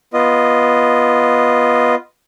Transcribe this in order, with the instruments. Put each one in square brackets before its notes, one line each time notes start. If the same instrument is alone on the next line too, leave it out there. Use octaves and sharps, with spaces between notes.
[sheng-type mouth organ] B3 F4 D#5